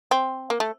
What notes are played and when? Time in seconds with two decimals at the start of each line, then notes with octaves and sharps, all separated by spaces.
0.11 C4
0.50 A#3
0.60 A3